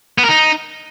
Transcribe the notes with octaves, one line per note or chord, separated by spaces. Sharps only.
B3
A#4
D#4